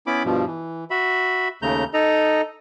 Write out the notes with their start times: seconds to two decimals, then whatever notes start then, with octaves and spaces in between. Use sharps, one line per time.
0.07 B3 C#4 E4 B5 D6
0.25 G2 B2 F3
0.46 E3
0.90 F#4 E5 B5
1.62 D#2 C#3 A3 A#5 G6
1.94 D#4 A4 D#5 A#5